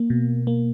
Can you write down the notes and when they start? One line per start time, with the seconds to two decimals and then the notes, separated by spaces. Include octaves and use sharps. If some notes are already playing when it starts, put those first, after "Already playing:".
Already playing: A#3
0.10 B2
0.47 A#3